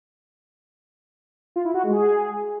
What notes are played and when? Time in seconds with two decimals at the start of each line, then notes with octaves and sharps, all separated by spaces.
1.56 F4
1.65 E4
1.74 F#4
1.83 G#3
1.93 G#4